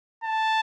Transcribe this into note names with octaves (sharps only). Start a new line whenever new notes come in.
A5